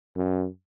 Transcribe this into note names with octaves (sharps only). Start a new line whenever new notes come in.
F#2